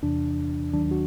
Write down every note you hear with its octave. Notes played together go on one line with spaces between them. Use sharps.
E2 C3 E3 D4
D#2 D#3 F#3 D4
F#4